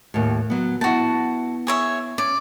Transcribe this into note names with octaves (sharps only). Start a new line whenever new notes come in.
D#2 A2
F#3 B3
B3 E4 F#4 A5
G#4 C#5 E5
C#4 D5